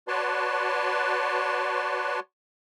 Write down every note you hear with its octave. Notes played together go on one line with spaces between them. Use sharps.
F#4 B4 C#5 D5 A5 C6